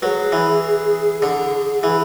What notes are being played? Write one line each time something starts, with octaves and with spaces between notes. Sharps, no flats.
F#3 G#4 B4
E3
D3
E3